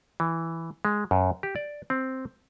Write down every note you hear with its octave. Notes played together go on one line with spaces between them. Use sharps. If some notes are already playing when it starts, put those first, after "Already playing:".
E3
G#3
F#2
G4
D5
C4